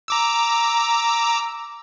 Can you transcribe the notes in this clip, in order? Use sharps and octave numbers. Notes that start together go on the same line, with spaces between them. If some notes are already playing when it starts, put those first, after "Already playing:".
A#5 D6 E6